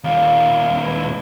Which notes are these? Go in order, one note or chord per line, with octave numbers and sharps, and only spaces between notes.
D#2 A#2 F5
G#3 E4 B4